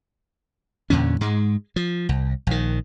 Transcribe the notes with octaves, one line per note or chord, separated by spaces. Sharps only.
E2 A#2 D3 C#4
G#2 G#3
F3
C2
A#1 D#3